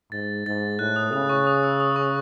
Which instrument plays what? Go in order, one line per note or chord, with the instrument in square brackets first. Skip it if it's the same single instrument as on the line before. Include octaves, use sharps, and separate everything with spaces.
[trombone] G#2 [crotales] A6
[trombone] G#2 [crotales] A6
[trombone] A2 [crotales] F#6
[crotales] D#6
[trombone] C#3 [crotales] D#6
[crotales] C#6
D#6
E6
D#6
C#6